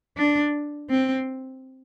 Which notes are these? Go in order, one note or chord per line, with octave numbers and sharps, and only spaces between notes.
D4
C4